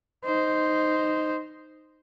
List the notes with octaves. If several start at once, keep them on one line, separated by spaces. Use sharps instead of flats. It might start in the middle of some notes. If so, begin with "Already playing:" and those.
D#4 C5